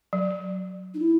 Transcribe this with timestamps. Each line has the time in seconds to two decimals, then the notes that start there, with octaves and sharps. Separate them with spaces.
0.13 F#3
0.94 D#4
1.00 E4